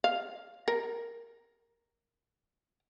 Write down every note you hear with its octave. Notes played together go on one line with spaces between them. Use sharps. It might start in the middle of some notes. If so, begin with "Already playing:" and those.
F5
A#4